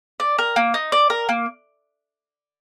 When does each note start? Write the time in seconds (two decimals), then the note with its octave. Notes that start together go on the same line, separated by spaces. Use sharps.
0.20 D5
0.39 A#4
0.56 A#3
0.74 D#4
0.92 D5
1.10 A#4
1.29 A#3